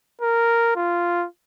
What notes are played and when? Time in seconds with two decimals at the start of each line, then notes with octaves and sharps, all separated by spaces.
0.21 A#4
0.76 F4